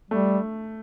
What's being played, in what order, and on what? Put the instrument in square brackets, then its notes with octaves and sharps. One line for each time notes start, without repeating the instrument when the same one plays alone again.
[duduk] G3 [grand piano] A3